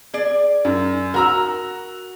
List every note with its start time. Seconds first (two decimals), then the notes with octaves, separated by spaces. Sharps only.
0.14 G#4 D5
0.65 F#2
1.14 F#4 A#4 A#5 E6